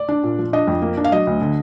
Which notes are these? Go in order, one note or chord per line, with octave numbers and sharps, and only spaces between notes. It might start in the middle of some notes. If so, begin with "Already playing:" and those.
Already playing: D5
D4
A#2
F3
D4 D#5
F2
A#3
D4
F5
F#3 D#5
D2
D3